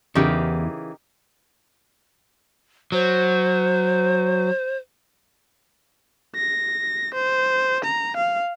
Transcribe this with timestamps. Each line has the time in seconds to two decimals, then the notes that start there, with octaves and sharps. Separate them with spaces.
0.15 E2 C#3 E3 D#4 G4 A#4
2.92 F#3 C5
6.35 A#6
7.14 C5
7.84 A#5
8.17 F5